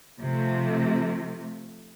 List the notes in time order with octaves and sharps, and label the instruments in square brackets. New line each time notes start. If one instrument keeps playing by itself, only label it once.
[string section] C3 F3 A3